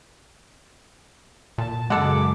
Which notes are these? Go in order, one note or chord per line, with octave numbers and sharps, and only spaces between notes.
A#2 A5
F#2 C#3 G#3 A4 F#5 D6